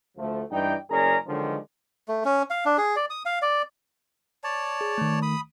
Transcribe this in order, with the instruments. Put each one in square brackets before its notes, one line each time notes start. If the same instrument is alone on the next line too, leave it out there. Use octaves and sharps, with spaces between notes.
[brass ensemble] D2 F3 A3
G2 E3 D#4 E4 D5 G5
F#1 C#4 G#4 A#4 D5 A#5
D3 D#3 F3 F#3 G#3 D4
[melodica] A3
C#4
F5
D4
G#4
D5
D#6
F5
D5
C#5 D5 A5
[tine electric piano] G#4
D#3 A3
[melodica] B5 D#6